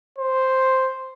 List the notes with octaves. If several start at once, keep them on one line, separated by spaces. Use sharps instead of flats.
C5